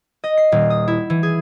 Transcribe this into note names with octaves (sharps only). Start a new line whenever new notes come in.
D#5
C7
D#1
D#6
E4
E3
G#4